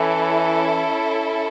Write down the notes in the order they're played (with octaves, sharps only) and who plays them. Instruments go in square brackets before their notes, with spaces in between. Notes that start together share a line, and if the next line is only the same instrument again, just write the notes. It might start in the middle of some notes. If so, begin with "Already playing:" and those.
Already playing: [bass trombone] E3 [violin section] C#4 E4 A4